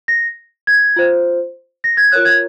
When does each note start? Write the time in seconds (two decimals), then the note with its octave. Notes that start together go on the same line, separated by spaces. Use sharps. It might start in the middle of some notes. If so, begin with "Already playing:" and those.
0.08 A#6
0.67 G#6
0.96 F4 C5
1.84 A#6
1.97 G#6
2.12 F4 A#4 C#5 F#6
2.25 G#6